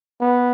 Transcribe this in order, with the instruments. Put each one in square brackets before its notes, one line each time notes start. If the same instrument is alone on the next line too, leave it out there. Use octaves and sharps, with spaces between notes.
[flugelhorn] B3